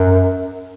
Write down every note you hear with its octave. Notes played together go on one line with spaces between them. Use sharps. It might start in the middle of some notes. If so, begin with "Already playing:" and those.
Already playing: F#2